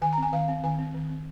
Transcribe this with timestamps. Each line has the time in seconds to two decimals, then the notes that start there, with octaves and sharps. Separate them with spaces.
0.02 D#3 G#5
0.13 A#5
0.18 C4 G#5
0.33 D#3 F5
0.49 C4
0.63 D#3 G#5
0.79 C4
0.94 D#3
1.10 C4